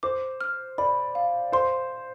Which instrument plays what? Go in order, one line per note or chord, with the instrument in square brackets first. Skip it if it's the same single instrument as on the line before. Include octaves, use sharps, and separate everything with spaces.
[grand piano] C5 [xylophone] D6
[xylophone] F6
[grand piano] D5 [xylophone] B5
[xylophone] F5
[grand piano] C5 [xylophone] C6